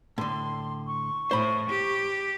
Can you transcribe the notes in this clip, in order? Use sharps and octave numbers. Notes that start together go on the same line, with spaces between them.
A2 D3 C6
C#6
A2 C5 B5
G4